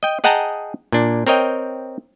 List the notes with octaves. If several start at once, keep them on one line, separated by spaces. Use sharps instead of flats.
D#5 G5
G#4 D#5 F#5 G5 A5 A#5
A#2 D4
C4 A#4 C#5 D#5 G5